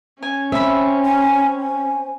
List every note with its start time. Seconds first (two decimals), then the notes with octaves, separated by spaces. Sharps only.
0.22 C#4 G#5
0.52 C4 E5 B5
1.05 G#5
1.59 G#5